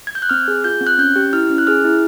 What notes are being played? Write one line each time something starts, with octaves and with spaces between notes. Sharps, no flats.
G#6
G6
F#6
C4 F6
G#4
F4 G6
C4
F#6
C#4 G6
G4
E4 F6
C#4
F#6
G#4 F6
E4